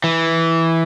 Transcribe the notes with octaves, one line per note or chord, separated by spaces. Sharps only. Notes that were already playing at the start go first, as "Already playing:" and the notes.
E3